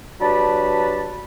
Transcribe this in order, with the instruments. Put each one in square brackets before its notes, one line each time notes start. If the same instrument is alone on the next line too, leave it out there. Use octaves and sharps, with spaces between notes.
[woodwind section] F#3 D4 G4 B4 A5 B5